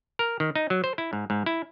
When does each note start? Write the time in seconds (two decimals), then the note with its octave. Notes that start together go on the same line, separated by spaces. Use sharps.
0.19 A#4
0.40 D#3
0.56 D#4
0.70 F#3
0.84 C5
0.98 E4
1.13 G#2
1.30 G#2
1.46 E4